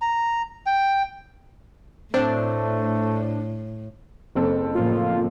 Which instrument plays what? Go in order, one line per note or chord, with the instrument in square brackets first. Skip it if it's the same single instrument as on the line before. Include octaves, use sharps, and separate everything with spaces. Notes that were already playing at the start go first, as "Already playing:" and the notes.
[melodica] A#5
G5
[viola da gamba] A2 [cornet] A3 [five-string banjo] C4 [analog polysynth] D4
[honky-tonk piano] F#1 C4 A4
[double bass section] A2 F3 A#3 [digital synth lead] F4